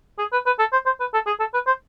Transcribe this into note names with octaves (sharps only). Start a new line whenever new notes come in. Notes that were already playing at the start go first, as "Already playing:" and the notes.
G#4
B4
B4
A4
C5
C5
B4
A4
G#4
A4
B4
C5